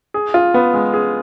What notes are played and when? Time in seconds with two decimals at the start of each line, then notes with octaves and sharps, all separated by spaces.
0.14 G#4
0.34 F4
0.54 B3
0.74 G#3
0.94 G#4